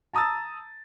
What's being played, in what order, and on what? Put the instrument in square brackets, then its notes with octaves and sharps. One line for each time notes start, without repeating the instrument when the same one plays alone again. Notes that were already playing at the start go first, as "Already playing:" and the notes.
[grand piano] A5 A#5 D#6 E6 A6